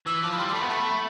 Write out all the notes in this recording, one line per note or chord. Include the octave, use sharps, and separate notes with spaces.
E3 E6
F3 D6
B5
G3 C6
C6
A3 B5
B3
A3 B5